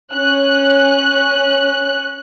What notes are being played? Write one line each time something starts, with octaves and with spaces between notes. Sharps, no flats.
C#4 F#6